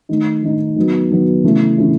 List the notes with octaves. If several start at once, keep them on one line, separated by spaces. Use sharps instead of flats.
D#3 A3 D#4
D#3 A3 D#4
D#3 F#3 B3
D#3 F#3 B3
C#3 E3 A3 C#4 E4
C#3 E3 A3 C#4 E4